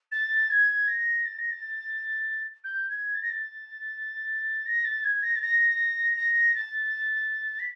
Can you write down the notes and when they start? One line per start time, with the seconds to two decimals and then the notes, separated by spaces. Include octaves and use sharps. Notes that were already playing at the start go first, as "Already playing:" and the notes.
0.11 A6
0.50 G#6
0.87 A#6
1.25 A6
1.38 A#6
1.50 A6
2.64 G6
2.89 G#6
3.14 A6
3.22 A#6
3.30 A6
4.66 A#6
4.84 A6
5.03 G#6
5.22 A#6
5.35 A6
5.41 A#6
6.17 A#6
6.54 A6
7.59 B6